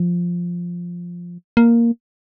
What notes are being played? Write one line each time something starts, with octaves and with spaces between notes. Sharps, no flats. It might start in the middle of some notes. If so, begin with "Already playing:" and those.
Already playing: F3
A#3